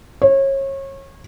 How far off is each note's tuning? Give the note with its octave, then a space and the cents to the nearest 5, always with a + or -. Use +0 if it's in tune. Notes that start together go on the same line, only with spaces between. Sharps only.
C#5 -30